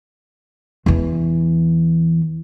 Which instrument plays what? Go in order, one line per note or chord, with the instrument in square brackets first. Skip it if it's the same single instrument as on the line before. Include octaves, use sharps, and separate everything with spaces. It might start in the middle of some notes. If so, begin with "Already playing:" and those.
[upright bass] E2 E3